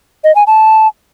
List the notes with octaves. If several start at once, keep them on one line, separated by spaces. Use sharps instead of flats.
D#5
G#5
A5